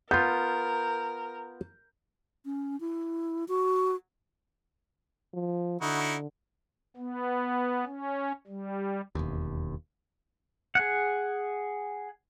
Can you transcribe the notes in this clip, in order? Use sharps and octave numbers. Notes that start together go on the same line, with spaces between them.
B3 F4 A#4 G6
C#4
E4
F#4
F3
D3 D#4 E4 F#4
B3
C#4
G3
E1 D#2
G#4 F#5